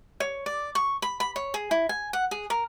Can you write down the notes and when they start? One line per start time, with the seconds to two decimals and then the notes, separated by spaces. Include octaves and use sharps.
0.20 C#5
0.46 D5
0.75 C#6
1.02 B5
1.20 B5
1.36 C#5
1.54 G#4
1.71 E4
1.89 G#5
2.13 F#5
2.31 G#4
2.50 A#4